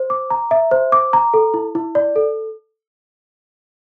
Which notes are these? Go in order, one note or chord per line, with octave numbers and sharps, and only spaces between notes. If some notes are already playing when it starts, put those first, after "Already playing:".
Already playing: C5
D6
A#5
E5
C5
D6
A#5
A4
E4
E4
D5
A4